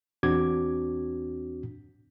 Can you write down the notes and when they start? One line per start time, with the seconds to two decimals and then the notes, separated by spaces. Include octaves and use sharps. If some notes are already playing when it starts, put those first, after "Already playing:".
0.23 E2 C4 D4 F#4 D6 G#6